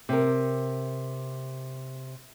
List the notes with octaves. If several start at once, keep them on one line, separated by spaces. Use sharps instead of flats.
C3 A#4